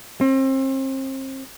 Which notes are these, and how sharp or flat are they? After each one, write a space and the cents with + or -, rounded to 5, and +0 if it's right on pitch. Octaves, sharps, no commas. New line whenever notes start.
C4 +35